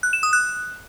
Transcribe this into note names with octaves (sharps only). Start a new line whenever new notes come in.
F#6
E7
D#6
F#6